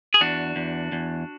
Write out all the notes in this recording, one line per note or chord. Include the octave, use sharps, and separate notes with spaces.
G#4
E2 D4 F#4
E2
E2